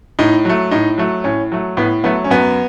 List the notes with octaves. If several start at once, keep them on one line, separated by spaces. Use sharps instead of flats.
A2 D#4
F#3 A3
A2 D#4
F#3 A3
A2 C#4
F#3 A3
A2 B3
F#3 A3 B3
C#4
F#2 B3